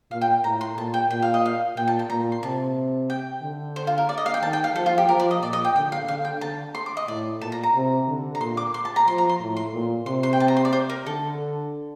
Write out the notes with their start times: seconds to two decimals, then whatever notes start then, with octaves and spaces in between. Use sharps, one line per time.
0.11 A#2 F5
0.21 G5
0.44 A2 A#5
0.61 C6
0.77 A#2 A5
0.94 G5
1.10 A#2 G5
1.22 F5
1.34 D#5
1.46 F5
1.77 A#2 G5
1.88 A5
1.99 A5
2.10 A#2 A#5
2.32 C6
2.43 C3 A5
3.10 G5
3.43 D3
3.76 C5
3.87 F4
3.98 A#4
4.09 D5
4.18 D#5
4.26 F5
4.34 G5
4.43 D#3 A5
4.53 G5
4.64 F5
4.75 F3 A4
4.86 F4
4.98 G4
5.09 F3 A#4
5.20 D5
5.31 D#5
5.42 A#2 D5
5.53 D#5
5.65 G5
5.75 D3 G5
5.92 F5
6.08 D3 F5
6.25 G5
6.41 D3 A5
6.75 C6
6.86 D6
6.97 D#5
7.08 A2 D5
7.41 A#2 A5
7.52 A#5
7.64 A#5
7.74 C3
8.08 D3
8.35 A#5
8.40 A#2 C6
8.57 D6
8.74 C6
8.85 A5
8.96 A#5
9.08 F3 C6
9.18 A#5
9.29 C6
9.40 A2
9.57 C6
9.74 A#2
10.06 C3 C6
10.23 C6
10.33 G5
10.40 A5
10.48 A#5
10.57 C6
10.65 D5
10.73 C5
10.90 A#4
11.06 D3 A4